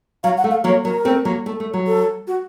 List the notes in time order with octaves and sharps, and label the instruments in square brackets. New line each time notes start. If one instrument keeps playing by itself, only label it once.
[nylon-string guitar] F#3 [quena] F5
[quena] F#5
[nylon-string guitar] A3
[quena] F5
[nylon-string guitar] F#3 A#3 [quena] C#5
[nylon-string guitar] F#3 [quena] A#4
[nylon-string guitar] A3 C4
F#3 A#3
A3
A3
F#3
[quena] A4
F#4